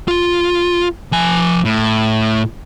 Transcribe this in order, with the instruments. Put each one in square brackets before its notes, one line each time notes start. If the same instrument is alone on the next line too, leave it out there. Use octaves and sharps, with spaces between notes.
[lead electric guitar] F4
F3 G#5
A2